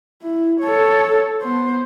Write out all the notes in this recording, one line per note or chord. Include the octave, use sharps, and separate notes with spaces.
E4
A4 C#5
B3 C5